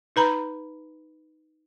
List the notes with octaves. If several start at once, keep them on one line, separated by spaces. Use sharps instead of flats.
D#4 B4 A#5 B5